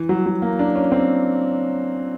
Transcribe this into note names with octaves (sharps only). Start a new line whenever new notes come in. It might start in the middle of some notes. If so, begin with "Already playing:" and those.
Already playing: E3
F#3
F#3
A#3
D4
C#4
C4